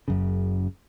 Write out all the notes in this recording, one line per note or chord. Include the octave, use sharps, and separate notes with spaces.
F#1 F#2 C#3